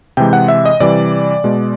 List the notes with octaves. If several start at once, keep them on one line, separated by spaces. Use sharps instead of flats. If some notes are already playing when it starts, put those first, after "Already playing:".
C3 E3 G#3 G5
F#5
E5
D#5
C3 E3 G3 D5
B2 G#3